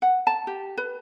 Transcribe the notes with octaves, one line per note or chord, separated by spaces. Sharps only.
F#5
A5
G4
B4